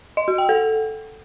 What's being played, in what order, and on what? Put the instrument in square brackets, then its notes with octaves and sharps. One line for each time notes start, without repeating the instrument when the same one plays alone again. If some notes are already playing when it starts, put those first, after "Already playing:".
[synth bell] D#5
F#4
G5
A4